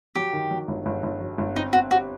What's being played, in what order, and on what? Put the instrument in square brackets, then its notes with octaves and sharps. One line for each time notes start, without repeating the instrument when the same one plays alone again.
[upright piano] F#3 [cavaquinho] G4
[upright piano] D#3
F#3
G1
G1
G1
F#3
G1
[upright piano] C4 [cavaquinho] D#4
[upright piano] C4 [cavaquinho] F#4
[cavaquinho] F#4 [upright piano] G4